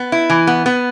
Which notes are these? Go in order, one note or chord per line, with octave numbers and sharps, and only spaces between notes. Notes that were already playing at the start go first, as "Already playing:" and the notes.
Already playing: B3
E4
E3
B3
B3